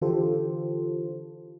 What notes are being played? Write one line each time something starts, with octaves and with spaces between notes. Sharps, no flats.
D3 E3 F4 G4 A4 C5